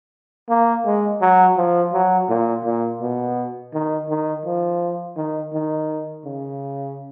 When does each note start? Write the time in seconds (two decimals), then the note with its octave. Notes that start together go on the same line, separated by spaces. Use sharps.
0.49 A#3
0.85 G#3
1.21 F#3
1.57 F3
1.93 F#3
2.29 A#2
2.65 A#2
3.01 B2
3.73 D#3
4.09 D#3
4.45 F3
5.17 D#3
5.53 D#3
6.25 C#3